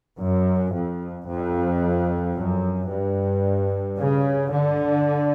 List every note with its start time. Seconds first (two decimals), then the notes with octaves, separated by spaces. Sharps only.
0.19 F#2
0.73 F2
1.27 F2
2.35 F#2
2.89 G2
3.97 C#3
4.52 D3